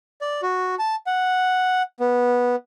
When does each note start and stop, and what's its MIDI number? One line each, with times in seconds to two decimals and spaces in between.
0.21 0.41 74
0.43 0.75 66
0.79 0.95 81
1.07 1.82 78
2.00 2.56 59